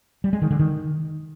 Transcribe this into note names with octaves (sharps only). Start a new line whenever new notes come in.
G3
G#3
D#3
D3
D#3